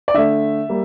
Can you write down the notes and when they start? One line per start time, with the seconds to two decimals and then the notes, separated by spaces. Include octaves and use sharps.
0.08 D5
0.14 D3 A3 E5
0.69 G3 A#3